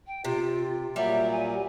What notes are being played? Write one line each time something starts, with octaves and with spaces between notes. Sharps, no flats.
G5
C3 F4
A#2 F#3 G3 E5
G#5